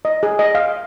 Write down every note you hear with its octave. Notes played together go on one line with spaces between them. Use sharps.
D#5
G#4
D#5
F5